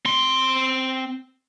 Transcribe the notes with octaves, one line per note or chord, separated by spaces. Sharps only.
C4 C6